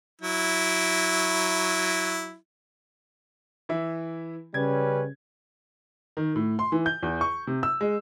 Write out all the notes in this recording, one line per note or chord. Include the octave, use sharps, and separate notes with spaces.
F#3 E4
E3 E4
C#3 G3 C#4 B4 G#6
D#3
A2
C6
E3
G6
E2
C#6
C3
E6
G#3